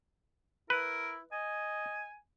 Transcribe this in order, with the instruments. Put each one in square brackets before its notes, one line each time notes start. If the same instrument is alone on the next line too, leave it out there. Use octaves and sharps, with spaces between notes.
[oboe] E4 [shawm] A#4 [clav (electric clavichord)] B4
[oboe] D#5 [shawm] G#5